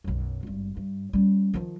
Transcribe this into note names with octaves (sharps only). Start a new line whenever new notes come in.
B1 F#2
G#1 G2
G2
G3 C#4
D#3 F3